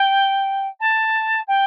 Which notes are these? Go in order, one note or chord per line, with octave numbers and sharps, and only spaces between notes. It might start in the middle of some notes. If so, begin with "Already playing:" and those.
Already playing: G5
A5
G5